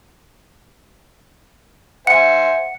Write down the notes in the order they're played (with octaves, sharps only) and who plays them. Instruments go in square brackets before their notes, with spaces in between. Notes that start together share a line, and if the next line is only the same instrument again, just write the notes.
[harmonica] C5 G#5 [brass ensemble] E5 [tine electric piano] F#5 [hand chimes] C#7